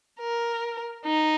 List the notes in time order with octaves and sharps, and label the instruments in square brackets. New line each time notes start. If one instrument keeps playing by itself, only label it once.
[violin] A#4
D#4